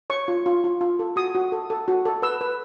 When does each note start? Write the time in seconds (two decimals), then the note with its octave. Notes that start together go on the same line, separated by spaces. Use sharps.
0.10 C#5 C#6
0.28 F4
0.46 F4
0.64 F4
0.81 F4
0.99 A4
1.16 F#4 D#6
1.35 F#4
1.52 A4
1.70 A4
1.88 F#4
2.05 A4
2.22 B4 E6
2.41 B4